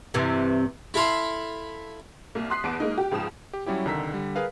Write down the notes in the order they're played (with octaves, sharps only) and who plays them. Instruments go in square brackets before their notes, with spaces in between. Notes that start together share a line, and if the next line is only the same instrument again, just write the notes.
[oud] G2 C3 E3
[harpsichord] E4 A4 F5 B5 C6
[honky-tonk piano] C2 A#3
C6 D#6 F#6 B6 C7
E2 B3 A5 D6 D7
G#3 A#3 D#4
G4
C#2 G#2 F3 D#6 E7
[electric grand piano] G4
F#3 G3 C#4 E4 G4
C2 D3 D#3 A#5 E6 B6
D3 G3
G#4 A#4 B4 F5